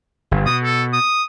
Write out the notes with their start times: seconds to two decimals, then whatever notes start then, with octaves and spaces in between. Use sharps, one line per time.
0.31 G1
0.46 B2 D#6
0.63 A4
0.93 D#6